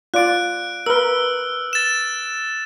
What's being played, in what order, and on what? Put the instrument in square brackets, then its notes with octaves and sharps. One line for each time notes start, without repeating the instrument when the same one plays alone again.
[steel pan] F4 D5 [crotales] F#6 D7
[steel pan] A#4 B4 [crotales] E6 F6
[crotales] A6 E7